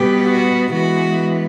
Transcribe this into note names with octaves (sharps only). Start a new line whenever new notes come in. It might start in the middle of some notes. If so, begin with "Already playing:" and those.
Already playing: B2 G3 B3 G4
F#4
E3 G#3 B3 F#4